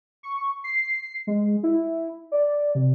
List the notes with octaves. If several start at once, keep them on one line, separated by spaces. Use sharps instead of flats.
C#6
C7
G#3
E4
D5
C3